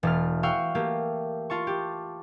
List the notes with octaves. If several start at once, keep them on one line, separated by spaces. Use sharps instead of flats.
E1 A3 F6
F#4 F5 G5 C#6 E6
A3 A#3 G4
F4 A5 C#6
G4